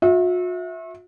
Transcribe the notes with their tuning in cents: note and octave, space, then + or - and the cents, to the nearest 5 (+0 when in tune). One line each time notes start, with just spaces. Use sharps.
F#4 -45 E5 -15